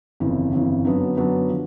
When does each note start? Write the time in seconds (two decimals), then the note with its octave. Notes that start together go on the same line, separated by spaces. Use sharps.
0.20 G1 F2 C#3 E3
0.52 G1 F2 C#3 E3
0.85 F#2 D3 F#3 B3 D4
1.16 F#2 D3 F#3 B3 D4
1.49 D3 F3